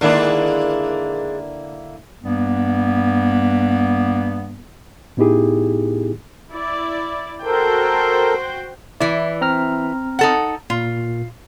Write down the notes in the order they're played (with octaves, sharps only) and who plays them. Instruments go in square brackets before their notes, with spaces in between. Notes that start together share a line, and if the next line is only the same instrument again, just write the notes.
[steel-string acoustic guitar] D3 A#3 E4 [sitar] D#3 G#3 D4
[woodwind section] G2 G3 A#3 B3
[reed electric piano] A2 B3 D#4 E4 G4 G#4
[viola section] E4 D5
[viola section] F#4 C5 G5 [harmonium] A4 A#4
[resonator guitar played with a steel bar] E3 E4 [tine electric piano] D5
[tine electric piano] C4 A#5 F6
[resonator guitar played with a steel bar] D#4 A4 F#5
[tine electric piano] A#2 [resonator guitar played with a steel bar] F4